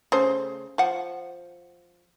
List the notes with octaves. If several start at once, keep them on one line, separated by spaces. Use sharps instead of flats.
C#3 A3 C5
F3 F#5